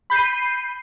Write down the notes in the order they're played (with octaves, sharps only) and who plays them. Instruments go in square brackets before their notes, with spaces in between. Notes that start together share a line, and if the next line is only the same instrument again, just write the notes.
[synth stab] B5 G6 C7 D#7